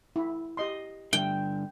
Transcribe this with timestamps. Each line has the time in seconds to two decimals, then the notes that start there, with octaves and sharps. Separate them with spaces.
0.16 E4
0.57 G4 D#5 C6
1.13 G2 D3 G5